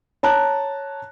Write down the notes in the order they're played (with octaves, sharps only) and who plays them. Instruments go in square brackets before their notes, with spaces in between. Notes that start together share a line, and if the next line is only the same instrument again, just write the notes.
[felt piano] C#5 A5 A#5 F#6